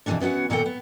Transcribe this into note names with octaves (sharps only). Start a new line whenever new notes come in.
B2 E3 F3 G3 C#4 D4
E3 B3 C#4 F#4 F#5
A#2 D#3 A#3 A4 F#5 G5
B3